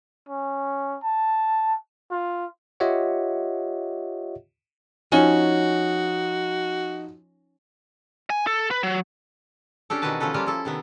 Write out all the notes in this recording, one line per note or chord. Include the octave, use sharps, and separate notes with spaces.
C#4
A5
F4
F4 G4 C#5 D#5 E5 F#5
F3 C#4 D#4 F#4
G#5
A4
B4
F#3
C#4 D4 G4 A4
B2 D#3 E3 F#4 B4 A5
F3 A3 C#4 A4 B4
F3 G3 A#3 F4
E4 A4
C3 D#3 B3